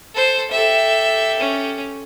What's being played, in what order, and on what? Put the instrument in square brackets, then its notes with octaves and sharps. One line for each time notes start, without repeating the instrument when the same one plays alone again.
[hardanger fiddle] A4 C5
[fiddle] G4 A4 [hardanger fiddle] E5
[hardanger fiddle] C#4